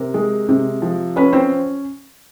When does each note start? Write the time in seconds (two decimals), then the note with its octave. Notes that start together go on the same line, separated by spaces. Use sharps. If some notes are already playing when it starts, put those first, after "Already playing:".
Already playing: C3 A#4
0.14 G#3
0.49 C3
0.82 F3
1.16 C#4 B4
1.33 C4 C5